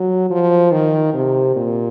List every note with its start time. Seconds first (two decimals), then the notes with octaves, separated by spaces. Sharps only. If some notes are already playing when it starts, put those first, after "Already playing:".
Already playing: F#3
0.30 F3
0.72 D#3
1.13 C3
1.56 A#2